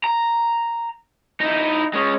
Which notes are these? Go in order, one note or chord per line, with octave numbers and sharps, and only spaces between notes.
A#5
D#4 E4
G#3 C#4